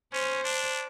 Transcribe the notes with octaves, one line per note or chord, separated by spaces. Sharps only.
C#4 C5
D4